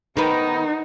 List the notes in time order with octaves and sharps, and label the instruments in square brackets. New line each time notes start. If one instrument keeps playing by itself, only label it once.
[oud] D#3 B3 [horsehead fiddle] D#4